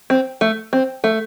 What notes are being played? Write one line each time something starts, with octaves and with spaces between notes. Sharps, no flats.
C4
A3
C4
A3